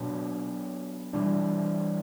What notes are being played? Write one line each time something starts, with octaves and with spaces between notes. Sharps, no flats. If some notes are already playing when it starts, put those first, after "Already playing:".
Already playing: B2 F#3 B3 D4
E3 G3 D4